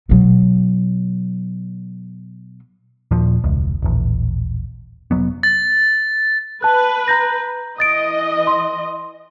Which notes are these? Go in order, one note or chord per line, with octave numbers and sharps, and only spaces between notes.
B2 F#3
D#2 A#2 F3
E1 C#2
D#1 A1
F1 D2 F#3 B3
A6
B4 A5 F#6
A#5 G6 A#6
E3 D#5 D#6 A6 D7
C6